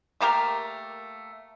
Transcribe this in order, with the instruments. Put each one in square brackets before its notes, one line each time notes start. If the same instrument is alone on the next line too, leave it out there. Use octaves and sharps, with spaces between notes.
[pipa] A3 A#3 G4 A#4